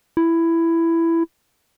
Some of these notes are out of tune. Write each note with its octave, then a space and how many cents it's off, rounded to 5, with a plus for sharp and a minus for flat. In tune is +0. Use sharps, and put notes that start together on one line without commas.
E4 +10